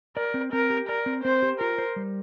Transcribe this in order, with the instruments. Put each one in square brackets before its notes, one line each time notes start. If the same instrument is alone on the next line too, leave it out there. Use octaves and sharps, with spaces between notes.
[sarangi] A#4 [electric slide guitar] D5
[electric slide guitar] C4
[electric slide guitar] C4 [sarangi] A#4
[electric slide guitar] G4
[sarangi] A#4 [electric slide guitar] D5
[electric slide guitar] C4
[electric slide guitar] C4 [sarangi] C5
[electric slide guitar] G4
[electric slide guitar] F4 [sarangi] A#4
[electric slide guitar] C5
G3